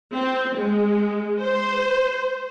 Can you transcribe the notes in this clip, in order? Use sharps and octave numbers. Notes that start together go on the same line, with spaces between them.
C4
G#3
C5